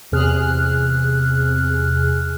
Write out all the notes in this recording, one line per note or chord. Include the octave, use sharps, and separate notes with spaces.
E2 C3 G#4 F6 F#6